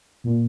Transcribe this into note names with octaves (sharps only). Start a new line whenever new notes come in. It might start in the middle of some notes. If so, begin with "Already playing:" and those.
A#2